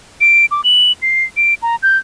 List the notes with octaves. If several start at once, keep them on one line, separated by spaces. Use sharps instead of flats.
D7
D6
F#7
C7
D7
A#5
G6